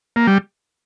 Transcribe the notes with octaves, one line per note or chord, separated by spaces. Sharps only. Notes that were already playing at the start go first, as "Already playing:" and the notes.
A#3
G3